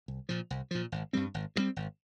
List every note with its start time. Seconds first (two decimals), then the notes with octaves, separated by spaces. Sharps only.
0.08 C2
0.29 A#2 F3
0.50 C2
0.71 A#2 F3
0.92 G#1
1.13 G2 G3 C4
1.34 G#1
1.56 G2 G3 C4
1.76 G#1